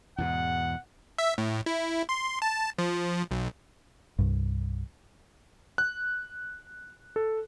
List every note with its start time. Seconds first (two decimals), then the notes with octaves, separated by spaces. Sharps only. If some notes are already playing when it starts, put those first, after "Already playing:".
0.18 E2 G#2 B2 F#5
1.18 E5
1.38 A2
1.66 E4
2.09 C6
2.42 A5
2.78 F3
3.31 B1
4.19 C2 G2
5.78 F#6
7.16 A4